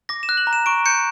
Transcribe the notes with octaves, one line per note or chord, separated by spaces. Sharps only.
D6 A#6
E7
F#6
F#7
A#5
E7
C#6 D7
G6 C#7